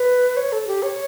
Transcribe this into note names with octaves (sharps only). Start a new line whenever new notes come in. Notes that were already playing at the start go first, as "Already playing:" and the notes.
Already playing: B4
C#5
A4
G4
C#5